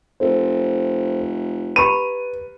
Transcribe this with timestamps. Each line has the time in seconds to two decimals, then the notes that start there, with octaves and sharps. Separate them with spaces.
0.20 F1 A4 C5
1.76 G4 B4 A#5 B5 D#7